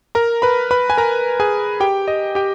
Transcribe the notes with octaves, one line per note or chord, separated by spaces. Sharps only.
A#4 A#5
B4 B5
B4 B5
G#5
A#4 A#5
G#4 G#5
G4 G5
D#5
G4 G5